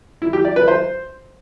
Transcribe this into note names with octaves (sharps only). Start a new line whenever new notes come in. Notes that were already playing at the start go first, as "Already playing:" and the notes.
E4
G4
D5
B4
C5